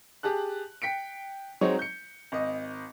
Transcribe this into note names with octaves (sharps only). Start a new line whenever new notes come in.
G4 G#4 A5 F#6
G5 B6 C#7 D7
F#3 G#3 C4 D#4 C#5
G6 C#7
G#1 D#5